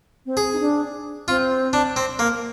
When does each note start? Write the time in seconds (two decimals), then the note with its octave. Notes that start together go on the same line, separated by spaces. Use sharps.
0.26 C4
0.37 G#4
0.53 D#4
0.60 D4
1.28 C4 F4
1.73 D4
1.96 C4
2.19 A#3